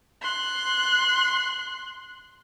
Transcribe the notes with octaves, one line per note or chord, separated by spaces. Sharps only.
C6 F#6